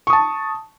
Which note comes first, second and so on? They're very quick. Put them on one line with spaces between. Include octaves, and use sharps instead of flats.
C#6 D#6 A5